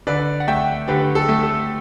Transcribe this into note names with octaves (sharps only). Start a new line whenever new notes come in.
D3 B4 D5
F#5
A3 E5 G5
D3 G4 B4
A4
A3
A4